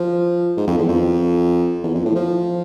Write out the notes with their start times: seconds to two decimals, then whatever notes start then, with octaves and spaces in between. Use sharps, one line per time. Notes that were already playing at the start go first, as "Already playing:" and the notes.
Already playing: F3
0.57 G#2
0.67 F2
0.78 E2
0.89 F2
1.84 E2
1.95 F2
2.05 A2
2.15 F3